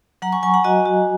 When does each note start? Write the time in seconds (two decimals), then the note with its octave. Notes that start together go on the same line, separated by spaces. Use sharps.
0.22 F#3 F#5 A#5
0.32 G#5 C#6
0.43 F#3 G#5 C#6
0.54 F#5 A#5
0.64 F#4 D#5 G#5
0.86 F#4